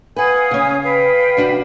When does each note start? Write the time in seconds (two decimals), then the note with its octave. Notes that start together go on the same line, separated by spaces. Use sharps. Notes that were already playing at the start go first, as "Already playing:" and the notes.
0.16 B4 F5 F#5 G#5 D#6
0.51 C#3 C#4
0.83 B4 F5 G5
1.37 C3 D4 F#4